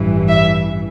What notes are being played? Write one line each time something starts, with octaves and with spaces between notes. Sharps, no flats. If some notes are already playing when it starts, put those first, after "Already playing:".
Already playing: A1 G2 E3
E5